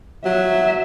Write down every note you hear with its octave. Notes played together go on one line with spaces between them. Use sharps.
F#3 E5